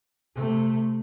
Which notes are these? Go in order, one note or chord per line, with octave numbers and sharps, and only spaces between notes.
C3 A3